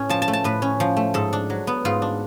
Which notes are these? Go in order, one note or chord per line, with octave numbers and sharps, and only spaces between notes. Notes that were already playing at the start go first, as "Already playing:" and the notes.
Already playing: A2 C#4
F3 A5
A5
A3
A5
A2 B4
C#4
F3
A3
G#2 A4
D4
F#3
B3
G#2 F4
D4